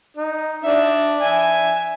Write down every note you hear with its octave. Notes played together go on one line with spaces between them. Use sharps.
D#4
D4 E5
E5 G#5